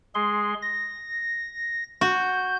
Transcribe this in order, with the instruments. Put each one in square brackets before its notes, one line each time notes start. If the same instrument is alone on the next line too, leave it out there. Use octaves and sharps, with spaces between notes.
[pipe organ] G#3 G#4 C6
A#6
[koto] F#4 [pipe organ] G6